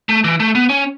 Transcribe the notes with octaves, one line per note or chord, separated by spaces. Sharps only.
A3
E3
A3
B3
C#4